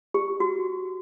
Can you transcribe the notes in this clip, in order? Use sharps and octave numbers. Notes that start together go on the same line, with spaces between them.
G4
F#4